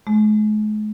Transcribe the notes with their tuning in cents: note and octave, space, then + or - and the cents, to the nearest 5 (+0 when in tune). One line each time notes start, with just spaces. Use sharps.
G#3 +45